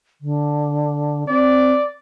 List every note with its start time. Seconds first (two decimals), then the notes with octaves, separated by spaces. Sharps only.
0.21 D3
1.28 C4 D5